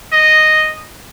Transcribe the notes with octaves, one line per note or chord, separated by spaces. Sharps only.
D#5